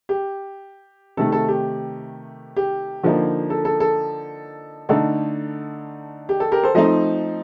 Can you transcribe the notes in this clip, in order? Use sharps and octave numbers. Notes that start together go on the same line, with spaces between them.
G4
C3 D#3 A3 A4
A4
G4
G4
D3 F3 A#3 D#4
A4
A4
A4
D3 A3 D#4 A4
G4
A4
G4 A#4
A4 C5
F3 A3 C4 D#4 C5 D#5